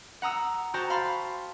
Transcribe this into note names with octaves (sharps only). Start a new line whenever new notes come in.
F#5 A#5 D#6 E6
F#4 C5 G5 A5 A#5
F5 B5 C6 A6